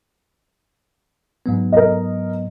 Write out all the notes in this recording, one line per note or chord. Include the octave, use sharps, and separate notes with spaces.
G#2 F#3 B3
A#4 D#5